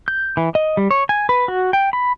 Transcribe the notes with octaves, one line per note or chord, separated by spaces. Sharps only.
G6
E3
D#5
G3
C#5
G#5
B4
F#4
G5
B5